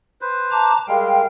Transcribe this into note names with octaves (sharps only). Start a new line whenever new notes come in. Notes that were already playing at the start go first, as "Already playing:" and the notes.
B4 C5
A5 A#5 D6
G3 G#3 A#4 F5 G5